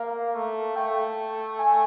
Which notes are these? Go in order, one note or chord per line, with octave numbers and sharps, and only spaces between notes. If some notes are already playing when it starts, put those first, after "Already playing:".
Already playing: A#3 F5
A3
A3 G5
G#5